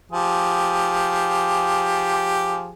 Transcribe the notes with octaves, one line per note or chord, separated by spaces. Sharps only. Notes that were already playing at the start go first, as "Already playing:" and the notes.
F3 G4 G#4